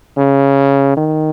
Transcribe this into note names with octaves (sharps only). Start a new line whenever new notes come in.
C#3
D#3